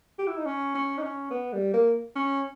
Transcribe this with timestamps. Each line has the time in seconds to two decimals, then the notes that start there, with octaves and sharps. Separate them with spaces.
0.19 G4
0.27 E4
0.37 D#4
0.46 C#4
0.75 C#4
0.98 D#4
1.03 C#4
1.30 B3
1.53 G3
1.73 A#3
2.16 C#4